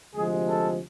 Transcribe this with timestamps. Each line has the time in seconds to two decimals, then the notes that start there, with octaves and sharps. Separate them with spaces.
0.13 D2 C3 F3 G#3 G#4
0.46 A4